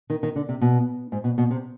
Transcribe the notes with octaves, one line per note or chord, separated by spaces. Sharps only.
D#3
D#3
D3
C3
B2
G#2
B2
B2
C3